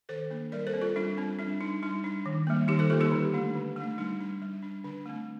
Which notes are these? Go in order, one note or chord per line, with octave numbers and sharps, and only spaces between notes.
D#3 A4 C5
A#3 D4
G3 A#4 D5
A4 C5
C4
F4 A4
G3 D4 F4
C4 D4
G3 D4
D4 D#4
G3 D#4
D4
D#3
G3 A#3
D#3 D#4 G4
A4 C5
G3 A#3 F4 A4
D#4 G4
D3
A3 D4
D3
A3
D4
G3 D#4
D4
G3
D4
D3 D4
A3 C4